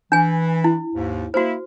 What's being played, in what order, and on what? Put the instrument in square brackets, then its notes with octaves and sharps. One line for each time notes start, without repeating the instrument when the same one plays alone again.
[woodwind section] E3 [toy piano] D4 G#5
[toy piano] E4
[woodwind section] D#2 G#2
[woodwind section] A#3 E4 [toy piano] F#4 C5